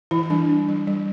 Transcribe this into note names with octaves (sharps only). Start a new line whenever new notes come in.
E3 E4
G3 D4
D4
G3
G3